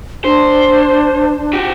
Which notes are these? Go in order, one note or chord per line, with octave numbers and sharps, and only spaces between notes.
D4 C5
F#4 G4